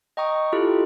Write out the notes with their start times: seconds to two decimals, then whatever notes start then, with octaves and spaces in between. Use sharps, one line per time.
0.17 D#5 G5 A#5 C#6 D#6
0.53 E4 F4 G4 A4